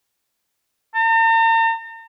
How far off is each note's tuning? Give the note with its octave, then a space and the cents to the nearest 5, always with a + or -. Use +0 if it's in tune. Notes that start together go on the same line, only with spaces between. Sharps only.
A#5 -45